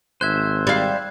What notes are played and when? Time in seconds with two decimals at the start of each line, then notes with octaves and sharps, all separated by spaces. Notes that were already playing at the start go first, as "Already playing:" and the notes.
0.21 G#1 C5 E5 F#6 G#6
0.67 G3 F5 G#6